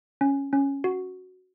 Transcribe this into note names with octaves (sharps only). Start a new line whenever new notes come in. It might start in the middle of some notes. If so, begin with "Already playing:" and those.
C#4
C#4
F#4